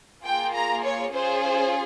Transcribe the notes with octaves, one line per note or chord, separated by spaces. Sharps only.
A#3 F4 G#4 G5
A#5
C#5
C#4 F4 G#4 C5
C5